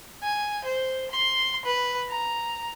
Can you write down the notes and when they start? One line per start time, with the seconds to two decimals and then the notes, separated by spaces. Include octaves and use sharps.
0.23 G#5
0.65 C5
1.11 C6
1.66 B4
2.09 A#5